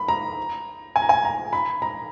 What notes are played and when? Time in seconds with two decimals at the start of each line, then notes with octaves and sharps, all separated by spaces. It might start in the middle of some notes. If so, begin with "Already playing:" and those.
Already playing: B5
0.08 A#5
0.96 G#5
1.02 A#5
1.09 G#5
1.25 A#5
1.53 B5
1.82 A#5